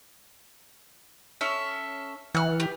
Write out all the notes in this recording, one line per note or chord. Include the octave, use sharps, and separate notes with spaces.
C#4 A4 E5
E3 F#5 F6
G4